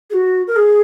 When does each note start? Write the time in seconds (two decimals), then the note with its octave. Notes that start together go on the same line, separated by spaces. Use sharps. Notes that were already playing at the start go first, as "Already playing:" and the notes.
0.10 G#4
0.13 F#4
0.47 A#4
0.56 G#4